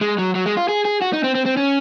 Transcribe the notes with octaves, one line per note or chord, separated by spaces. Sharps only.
G#3
F#3
F#3
G#3
F4
G#4
G#4
F#4
D#4
C4
C4
C4
C#4